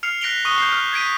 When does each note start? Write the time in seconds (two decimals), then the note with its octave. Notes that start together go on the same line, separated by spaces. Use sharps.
0.03 F6 C7 C#7 F7
0.21 F#6 A#6 B6 D7 F7 G7
0.45 C#6 D#6 F#6 D#7 G7
0.58 G6 C7
0.72 F6
0.92 G6 G#6 B6 D7 D#7